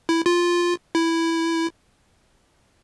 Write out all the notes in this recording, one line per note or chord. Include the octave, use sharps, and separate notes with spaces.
E4
F4
E4